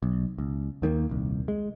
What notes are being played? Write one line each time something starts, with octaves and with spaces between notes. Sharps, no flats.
B1
C#2
D#2 D#3 A3 A#3
D#1 C2
G#3